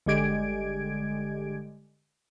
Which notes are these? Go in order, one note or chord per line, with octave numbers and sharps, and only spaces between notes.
G1 D3 G#3 G4 G#6 D7